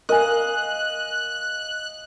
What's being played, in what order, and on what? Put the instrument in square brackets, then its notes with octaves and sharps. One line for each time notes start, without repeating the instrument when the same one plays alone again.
[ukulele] A#4 G#5 [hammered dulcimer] D#5 F5 [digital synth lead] F#6